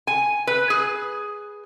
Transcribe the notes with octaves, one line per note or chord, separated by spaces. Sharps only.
G#5
B4
G#4